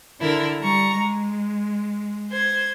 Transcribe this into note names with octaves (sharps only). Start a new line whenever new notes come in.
D3 E4 A#4
G3 A#5 C#6
G#3
C5 G#6